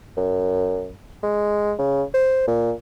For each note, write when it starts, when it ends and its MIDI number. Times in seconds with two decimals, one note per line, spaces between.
0.17 0.91 42
1.23 1.74 56
1.79 2.03 49
2.14 2.46 72
2.48 2.73 46